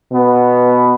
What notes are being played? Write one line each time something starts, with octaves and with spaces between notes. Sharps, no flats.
B2 B3